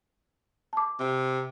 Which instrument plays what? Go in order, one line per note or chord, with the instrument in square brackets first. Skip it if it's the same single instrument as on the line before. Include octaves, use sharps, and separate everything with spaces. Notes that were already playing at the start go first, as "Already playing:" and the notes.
[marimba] A5 D6
[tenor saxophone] C3